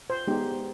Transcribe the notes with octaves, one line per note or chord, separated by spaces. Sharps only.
C5
G#3 B3 D#4 G4